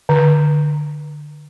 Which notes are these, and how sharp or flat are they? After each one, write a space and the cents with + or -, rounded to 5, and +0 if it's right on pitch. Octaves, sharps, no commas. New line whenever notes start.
D3 +20